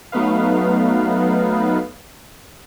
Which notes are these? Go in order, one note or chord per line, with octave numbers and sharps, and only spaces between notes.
F#3 A3 B3 D#4 B4 F5